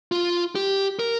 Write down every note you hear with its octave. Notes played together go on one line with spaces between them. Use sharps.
F4
G4
A#4